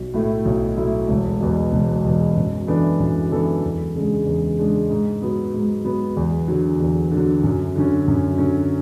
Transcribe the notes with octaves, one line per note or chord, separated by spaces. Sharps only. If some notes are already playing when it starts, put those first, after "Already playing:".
Already playing: B1
A2 F#3 A3 E4
B1
A2 F#3 A3 E4
E1
E2 B2
E1
E2 B2
F#2
E3 B3 D4 A4
F#2
E3 B3 D4 A4
E2
C#3 G#3 D4
E2
C#3 G#3 D4
G#2
F#3 B3
G#2
F#3 B3
E2
D3 F#3
E2
D3
F#3
F#2
D3 F#3 C#4
F#2
D3 F#3 C#4